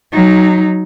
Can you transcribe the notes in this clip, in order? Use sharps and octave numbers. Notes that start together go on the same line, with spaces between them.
F#3 D#4